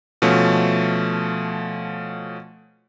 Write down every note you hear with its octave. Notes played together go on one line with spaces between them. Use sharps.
B2 F3 A3 C#4